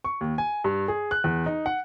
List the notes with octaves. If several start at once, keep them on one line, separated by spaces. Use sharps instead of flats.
C#6
D#2
G#5
G2
G#4
F#6
E2
D#4
F#5